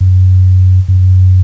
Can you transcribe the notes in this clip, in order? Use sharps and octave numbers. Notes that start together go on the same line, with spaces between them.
F#2
F#2